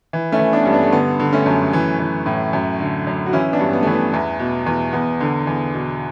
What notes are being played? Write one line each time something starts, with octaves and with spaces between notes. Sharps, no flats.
E3
A3 C#4
E3
B3 D4
G2 C#4
B3 D4
A3
D3 B3
D3
A3 C#4
F#2
E3
E3
A2
F#2
D3
F#2
F#4
E3 C#4 E4
B3 D4
G2
B3
E3 A3
B3
E2
B2
E2
E2 B3
D3
E2
B2